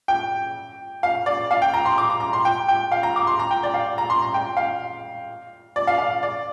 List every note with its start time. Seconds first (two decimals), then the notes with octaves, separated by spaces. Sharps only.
0.08 G5
1.03 F5
1.26 D5
1.51 F5
1.62 G5
1.74 A#5
1.86 C6
1.98 D6
2.10 A#5
2.20 A#5
2.33 C6
2.45 G5
2.68 G5
2.92 F5
3.03 A#5
3.16 D6
3.27 C6
3.39 A#5
3.51 G5
3.63 D5
3.74 F5
3.98 A#5
4.10 C6
4.22 A#5
4.34 G5
4.57 F5
5.76 D5
5.87 F5
5.98 F5
6.23 D5